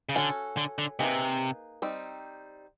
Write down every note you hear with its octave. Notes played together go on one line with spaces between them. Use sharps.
C#3
D3 C#4 F#4 A4
D3
D3
C3 A#3 D#4 G#4 B4
G3 C4 D#4